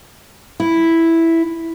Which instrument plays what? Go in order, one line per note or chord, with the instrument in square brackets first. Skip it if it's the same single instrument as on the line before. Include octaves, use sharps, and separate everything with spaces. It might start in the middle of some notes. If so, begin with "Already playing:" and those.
[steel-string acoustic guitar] E4